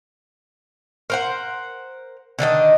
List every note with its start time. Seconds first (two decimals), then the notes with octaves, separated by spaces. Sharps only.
1.10 A#4 C5 F#5
2.39 D3 D#3 D4 D#5